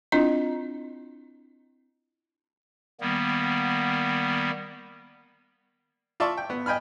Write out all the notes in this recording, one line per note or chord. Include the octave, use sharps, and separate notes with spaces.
C4 D4 E4 F4 D#5
D#3 G3 A#3 B3
F4 D5 E5 A5 C6 C#6
G5
B3
D#5 G5 G#5 B5 F6